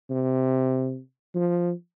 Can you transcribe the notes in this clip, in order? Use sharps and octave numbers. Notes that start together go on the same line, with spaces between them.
C3
F3